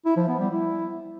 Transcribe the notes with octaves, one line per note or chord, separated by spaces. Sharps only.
E4
F3
B3
G3
E4